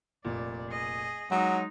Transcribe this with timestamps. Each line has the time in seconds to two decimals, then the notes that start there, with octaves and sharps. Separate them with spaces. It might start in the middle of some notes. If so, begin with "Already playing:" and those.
0.25 F1 A#2 D5
0.69 G#4 D#5
1.31 F#3 G#3 D#4 D#6